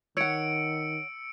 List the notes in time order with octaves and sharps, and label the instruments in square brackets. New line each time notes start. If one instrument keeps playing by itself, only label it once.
[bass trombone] D#3 [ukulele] C#5 F#5 [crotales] E6 C#7 D7